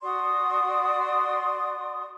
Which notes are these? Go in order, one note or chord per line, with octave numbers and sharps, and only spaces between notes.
F#4 D5 C6 D#6